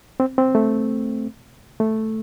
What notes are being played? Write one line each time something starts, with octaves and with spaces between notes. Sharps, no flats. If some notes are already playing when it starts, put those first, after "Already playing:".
C4
C4
A3
A3